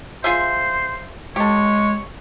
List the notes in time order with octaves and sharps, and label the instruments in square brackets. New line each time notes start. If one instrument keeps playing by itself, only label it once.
[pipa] F4 G#4 E5 [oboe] C5
[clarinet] G#3 [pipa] G4 A4 [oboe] C#5